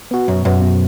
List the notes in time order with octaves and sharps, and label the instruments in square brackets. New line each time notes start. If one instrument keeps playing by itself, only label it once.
[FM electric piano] B3 F#4
[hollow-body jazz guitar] F#2 [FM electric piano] B2
[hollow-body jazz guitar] F#2 [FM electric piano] B3 F#4
[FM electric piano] B2